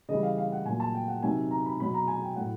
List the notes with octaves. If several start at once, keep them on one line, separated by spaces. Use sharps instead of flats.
C#3 E3 G3 D#5
F5
F5
F#5
A#2 F#3 G#5
A5
G5
F#5
C3 D#3 F#3 G#5
A#5
B5
B2 F#3 B5
A#5
G#5
G5
A2 F#3 F#5